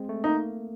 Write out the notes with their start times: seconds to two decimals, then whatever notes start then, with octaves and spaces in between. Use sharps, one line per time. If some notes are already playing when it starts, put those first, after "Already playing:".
Already playing: G#3 C4
0.09 A3
0.24 A#3 D#4